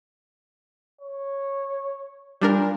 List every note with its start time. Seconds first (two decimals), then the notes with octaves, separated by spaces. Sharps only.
1.01 C#5
2.41 A#2 G3 D4 A#4